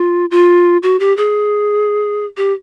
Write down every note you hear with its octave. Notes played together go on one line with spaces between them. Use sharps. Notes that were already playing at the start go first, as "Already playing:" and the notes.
Already playing: F4
F4
F#4
G4
G#4
G4